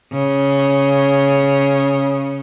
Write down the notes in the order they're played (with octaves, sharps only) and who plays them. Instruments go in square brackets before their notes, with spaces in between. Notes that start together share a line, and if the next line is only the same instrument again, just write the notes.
[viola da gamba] C#3